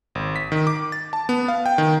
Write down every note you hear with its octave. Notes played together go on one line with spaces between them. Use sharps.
G#1
B6
D#3
D6
A6
A5
B3
F5
G5
D#3